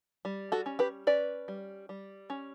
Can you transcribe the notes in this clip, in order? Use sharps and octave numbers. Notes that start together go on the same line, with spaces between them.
G3
F#4 A4
C#4
G4 B4
C#4 B4 D5
G3
G3
C#4